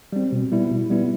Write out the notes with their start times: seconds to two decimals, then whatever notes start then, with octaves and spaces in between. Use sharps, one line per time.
0.13 G3 C4
0.32 B2
0.52 G3 B3 E4
0.71 B2
0.90 G3 B3 E4